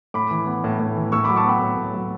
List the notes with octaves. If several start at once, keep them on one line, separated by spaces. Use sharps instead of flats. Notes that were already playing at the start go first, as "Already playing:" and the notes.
A2 B5 D6
E3
B3
A2
A2
E3
A2 C#6 E6
F#3 B5 D6
A5 C#6
B3 G5 B5
A2
A2
F#3